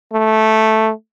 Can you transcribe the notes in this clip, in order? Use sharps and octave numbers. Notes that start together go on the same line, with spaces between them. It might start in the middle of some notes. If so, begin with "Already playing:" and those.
A3